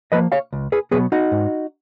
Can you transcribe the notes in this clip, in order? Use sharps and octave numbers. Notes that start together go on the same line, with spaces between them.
F3 A#3 B4 D#5
C#5 F5
C#2
G#4 B4
B2 F#3 B3 G#4 B4
D#4 F#4
G#2